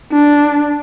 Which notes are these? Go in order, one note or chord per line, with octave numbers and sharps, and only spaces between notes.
D4